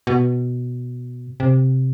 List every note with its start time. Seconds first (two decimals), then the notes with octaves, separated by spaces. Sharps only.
0.07 B2
1.40 C3